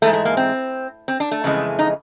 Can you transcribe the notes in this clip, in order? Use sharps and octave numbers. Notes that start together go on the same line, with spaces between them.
G#2 E3 G#3 A3
A3
A#3
C4
C4
D4
A3
F2 C#3 E3 G#3
D#4